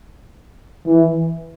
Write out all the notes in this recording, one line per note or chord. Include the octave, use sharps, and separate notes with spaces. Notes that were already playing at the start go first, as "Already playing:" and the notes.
E3